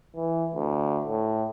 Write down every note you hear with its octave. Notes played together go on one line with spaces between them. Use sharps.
E3
D2
A2